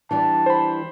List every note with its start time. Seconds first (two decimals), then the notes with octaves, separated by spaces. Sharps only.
0.11 E3 G3 D4 A5
0.46 C5 B5